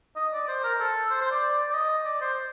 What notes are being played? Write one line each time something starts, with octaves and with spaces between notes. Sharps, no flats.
D#5
D5
C5
A#4
A4
C5
C5
D5
D5
D#5
D5
C5